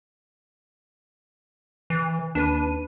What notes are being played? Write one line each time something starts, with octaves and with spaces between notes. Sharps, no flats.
E3
D#2 D4 B4 D#7